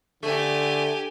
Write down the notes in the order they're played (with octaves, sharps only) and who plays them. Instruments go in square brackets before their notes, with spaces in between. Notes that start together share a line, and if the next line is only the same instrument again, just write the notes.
[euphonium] D3 [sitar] A3 [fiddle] G4 G#5